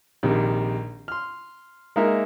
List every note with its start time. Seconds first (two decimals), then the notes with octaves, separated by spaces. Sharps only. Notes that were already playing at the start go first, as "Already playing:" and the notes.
0.23 A#1 C3 D#3
1.08 C6 F6
1.96 G#3 A#3 D#4 A#4 E5